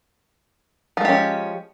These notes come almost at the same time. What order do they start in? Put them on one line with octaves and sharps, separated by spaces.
F3 G#3 G4 C#4